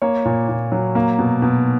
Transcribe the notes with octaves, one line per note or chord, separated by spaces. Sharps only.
A#3 C#5
A#2
A#2
F#3
A#3
B2
B2